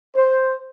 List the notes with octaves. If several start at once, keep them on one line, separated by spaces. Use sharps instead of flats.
C5